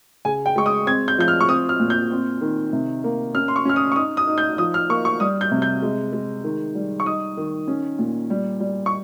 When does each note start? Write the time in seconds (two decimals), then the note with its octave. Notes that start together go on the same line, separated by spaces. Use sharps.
0.25 C#3 G#5
0.46 G5
0.56 G#3 C#6
0.66 D#6
0.87 C4 G#6
1.08 G6
1.18 F3 G6
1.28 F6
1.41 C#6
1.48 C4 D#6
1.69 F6
1.80 A#2
1.90 G6
2.11 C4
2.41 D#3
2.73 C3
3.04 A#3
3.35 C#4 F6
3.48 C6
3.56 C#6
3.65 C#4 F6
3.76 D#6
3.92 C#6
3.96 D#4 D#6
4.17 D#6
4.27 D#4
4.38 G6
4.58 F3 D#6
4.74 F6
4.89 A#3 C#6
5.05 C#6
5.20 G3 D#6
5.41 G6
5.51 C3
5.62 G6
5.82 G#3
6.13 G#3
6.44 D#3
6.75 G3
7.00 C#6
7.06 D#4 D#6
7.37 D#3
7.68 C#4
7.99 A#2
8.30 G3
8.60 G3
8.86 C#6